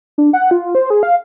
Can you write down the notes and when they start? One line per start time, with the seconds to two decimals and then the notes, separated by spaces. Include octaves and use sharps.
0.18 D4
0.33 F#5
0.51 F4
0.75 C5
0.90 G#4
1.03 F5